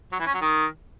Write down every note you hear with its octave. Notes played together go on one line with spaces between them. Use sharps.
F#3
E3
C#4
F#3
D#3